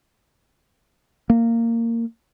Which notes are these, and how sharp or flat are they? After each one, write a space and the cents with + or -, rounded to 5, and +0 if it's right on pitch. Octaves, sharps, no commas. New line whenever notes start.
A#3 -15